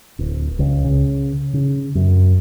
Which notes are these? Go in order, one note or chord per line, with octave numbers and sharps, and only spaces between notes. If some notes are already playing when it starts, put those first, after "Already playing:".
D1
C#2
C#3
C#3
F#2